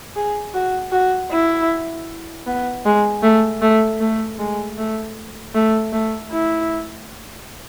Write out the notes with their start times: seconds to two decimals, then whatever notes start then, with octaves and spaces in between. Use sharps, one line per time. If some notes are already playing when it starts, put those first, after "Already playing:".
0.16 G#4
0.54 F#4
0.92 F#4
1.31 E4
2.47 B3
2.85 G#3
3.23 A3
3.62 A3
4.00 A3
4.39 G#3
4.78 A3
5.54 A3
5.93 A3
6.31 E4